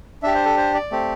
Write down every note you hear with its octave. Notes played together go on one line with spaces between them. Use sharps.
D4 G4 E5
C5
A4
C5
D5
A3 C4 G4